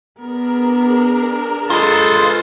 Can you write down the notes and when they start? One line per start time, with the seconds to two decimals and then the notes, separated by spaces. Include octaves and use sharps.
0.20 B3 D4 G#4 A#4
1.70 G#3 F4 A4 B4 C5